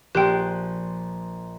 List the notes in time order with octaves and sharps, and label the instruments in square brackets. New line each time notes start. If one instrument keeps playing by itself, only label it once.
[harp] A#1 C5 F#6 [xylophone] G4 G5